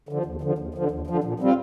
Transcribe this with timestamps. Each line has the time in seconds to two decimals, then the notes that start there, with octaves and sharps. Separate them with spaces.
0.09 D3 F3
0.26 D#2
0.41 D3 F3
0.58 D#2
0.74 D3 F3
0.91 D#2
1.07 D3 F3
1.24 A#2
1.40 G3 C4 F4